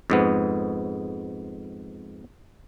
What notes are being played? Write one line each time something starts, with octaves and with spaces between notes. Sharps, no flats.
F2 G#2 B3